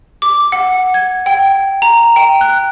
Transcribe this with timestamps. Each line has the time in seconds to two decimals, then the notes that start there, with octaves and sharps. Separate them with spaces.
0.22 D6
0.52 F#5
0.94 G#6
1.26 G5
1.82 A#5
2.16 G5
2.41 F#6